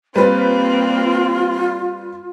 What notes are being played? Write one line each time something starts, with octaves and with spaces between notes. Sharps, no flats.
G3 A#3 C4 F4 B4 C5